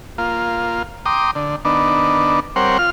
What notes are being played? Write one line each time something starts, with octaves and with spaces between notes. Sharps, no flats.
A#3 F4
G5 A#5 C6 D6 D#6
D3
D#3 B3 D4
G3 C4 A#4 C5 C#5 F#5
F4 F6